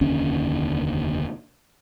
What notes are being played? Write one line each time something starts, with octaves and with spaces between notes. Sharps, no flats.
F1 D#2 D3 C#4